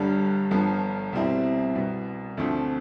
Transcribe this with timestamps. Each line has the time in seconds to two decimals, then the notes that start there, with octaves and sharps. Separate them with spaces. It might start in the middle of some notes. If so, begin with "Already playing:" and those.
Already playing: G1 G2 D3 G3
0.51 G1 G2 F3 B3
1.13 C2 B2 G3 C4 E4
1.75 C2 B2 B3
2.37 D2 D3 F3 A3 C4